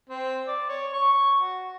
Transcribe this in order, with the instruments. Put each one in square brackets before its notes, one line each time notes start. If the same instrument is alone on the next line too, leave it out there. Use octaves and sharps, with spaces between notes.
[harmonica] C4
D5
C#5
C#6
F#4